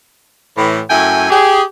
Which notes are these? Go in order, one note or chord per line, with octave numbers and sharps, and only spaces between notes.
A2 E3
F#2 A3 E4 G5 G#5
G4 G#4